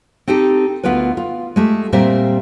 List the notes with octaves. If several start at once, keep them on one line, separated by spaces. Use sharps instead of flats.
C4 D#4 G4 A4
D2 B3 F4 A#4 B4
F4
G#3 A3 G4
A#2 G3 C4 A#4 C5 E5